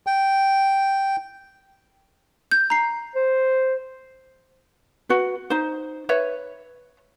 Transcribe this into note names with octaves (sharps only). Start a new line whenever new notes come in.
G5
G6
A#5 C7
C5
F#4 B4
D#4 C5
B4 C#5 E5